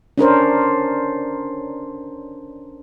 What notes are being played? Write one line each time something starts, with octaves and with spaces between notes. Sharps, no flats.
C#4 D4 A#4 C5